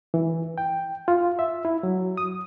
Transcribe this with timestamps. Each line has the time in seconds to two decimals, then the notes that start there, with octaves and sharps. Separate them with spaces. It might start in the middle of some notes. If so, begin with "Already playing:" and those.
0.14 E3
0.58 G5
1.08 F4
1.39 E5
1.65 E4
1.83 F#3
2.17 D#6